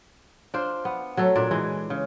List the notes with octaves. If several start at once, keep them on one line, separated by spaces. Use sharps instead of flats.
D4 F4 C5
B3
F#3 A3 A4
A#2 D4 D5
E3 G#3
C#3